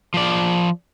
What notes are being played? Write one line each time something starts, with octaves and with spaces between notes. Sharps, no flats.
F3 D5